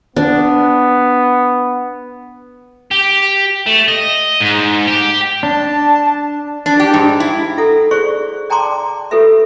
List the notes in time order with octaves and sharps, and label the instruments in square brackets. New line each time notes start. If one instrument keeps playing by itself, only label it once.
[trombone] B3 [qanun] D4
[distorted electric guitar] G4
A3
D#5
G#2
G4
[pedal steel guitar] D4 [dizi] A5
[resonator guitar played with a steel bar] D4
G4
G#2
E4
[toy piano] E4 A4 F#5
G#4 C5 D5 C#6
D5 G5 A5 A#5 C6 D6
F4 G4 A4 B4 E5